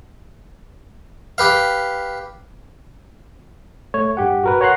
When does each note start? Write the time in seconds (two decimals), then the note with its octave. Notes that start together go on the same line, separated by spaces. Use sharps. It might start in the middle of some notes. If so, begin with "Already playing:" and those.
1.38 G4 B4 F5
3.94 A3 C#5
4.17 G2 G4 F#5
4.44 F#4 A#4 B4
4.61 C#5 F#5 A#5 C6 F#6 C7